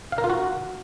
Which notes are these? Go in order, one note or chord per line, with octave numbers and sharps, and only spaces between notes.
F5
A#4
F4
F#4